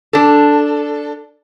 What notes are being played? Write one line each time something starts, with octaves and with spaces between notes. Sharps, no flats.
D4 A4